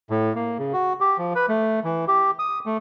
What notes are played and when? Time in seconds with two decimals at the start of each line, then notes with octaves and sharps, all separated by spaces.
0.10 A2
0.35 A#3
0.59 C#3
0.73 F#4
1.01 G4
1.18 F3
1.35 B4
1.49 A3
1.84 E3
2.08 G4
2.39 D#6
2.66 A3